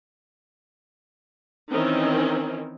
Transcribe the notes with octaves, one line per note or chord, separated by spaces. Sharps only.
D#3 E3 C4 C#4 D#4